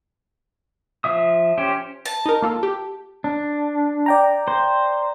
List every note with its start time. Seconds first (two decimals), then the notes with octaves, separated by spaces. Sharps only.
1.04 F3 E5 D#6
1.58 C#4 G4 C5
2.06 A5
2.26 D#4 A#4
2.42 A#3 F4 A4
2.63 G4
3.24 D4
4.06 D5 G5 A#5
4.48 C5